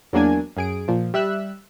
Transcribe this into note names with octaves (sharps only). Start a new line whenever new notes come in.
E2 F#3 A#3 D4 G#5 G#6
F#2 G#4 D7
A#2 F3
G3 E5 E6 F#6